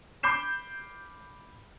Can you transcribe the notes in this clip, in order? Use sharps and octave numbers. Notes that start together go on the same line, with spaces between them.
B5 D6 G6 C7 E7